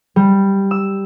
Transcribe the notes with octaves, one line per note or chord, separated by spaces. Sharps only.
G3
E6